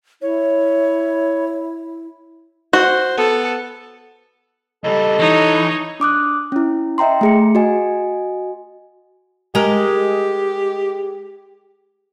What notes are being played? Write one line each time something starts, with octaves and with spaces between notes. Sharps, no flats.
E4 C#5
F#4 C5
B3 A4
C#2 G3 A4 D#5
E3 D#4 C#5
D4 D6 D#6 F#6
C#4 E4
D#5 E5 G5 A#5 C6
A3 G#4 C#7
F#4 D#5 G#5
G#3 G4 A#4